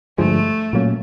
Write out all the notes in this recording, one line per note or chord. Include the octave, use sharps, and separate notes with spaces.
G2 D3 F3 G#3 A3
A#2 F#3 A#3 C#4